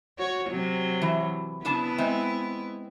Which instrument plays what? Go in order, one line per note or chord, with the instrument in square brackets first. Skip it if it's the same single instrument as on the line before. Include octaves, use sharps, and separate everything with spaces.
[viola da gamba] F#4 C#5
C3 F#3
[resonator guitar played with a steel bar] E3
[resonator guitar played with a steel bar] C#3 D4 A5 [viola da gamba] B3 E4 B4
[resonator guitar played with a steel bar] G#3 C4 E5